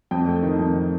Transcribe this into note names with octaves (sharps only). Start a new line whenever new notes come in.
F2 G5
A3
D#3
F2